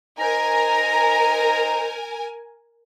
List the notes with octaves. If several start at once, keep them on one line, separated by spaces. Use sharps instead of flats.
D#4 A#4 C5 G#5 A#5